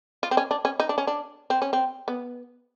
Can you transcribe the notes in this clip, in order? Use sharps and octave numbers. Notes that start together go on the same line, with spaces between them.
F4
C4
C#4
D4
C#4
D#4
D4
C#4
D4
C4
C#4
C4
B3